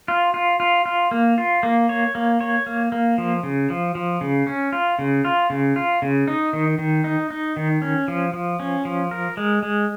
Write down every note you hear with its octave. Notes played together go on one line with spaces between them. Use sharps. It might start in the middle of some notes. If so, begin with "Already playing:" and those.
F4
F4
F4
F4
A#3
F4
A#3
C#5
A#3
C#5
A#3
A#3
F3
C#3
F3
F3
C#3
C#4
F4
C#3
F4
C#3
F4
C#3
D#4
D#3
D#3
D#4
D#4
D#3
C#4
F3
F3
C#4
F3
A#4
G#3
G#3